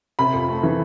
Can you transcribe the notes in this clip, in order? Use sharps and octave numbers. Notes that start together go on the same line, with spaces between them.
C3 B5
F2
A3
E3